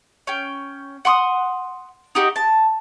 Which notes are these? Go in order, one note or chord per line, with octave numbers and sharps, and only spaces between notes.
C#4 G5
F#5 C6 C#6 D#6
D#4 F#4 G4
A5